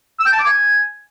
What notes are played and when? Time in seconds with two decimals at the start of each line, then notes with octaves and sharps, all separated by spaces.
0.20 E6
0.26 G5
0.33 A5
0.39 D6
0.46 G#5